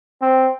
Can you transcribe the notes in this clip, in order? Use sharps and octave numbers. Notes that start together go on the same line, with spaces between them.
C4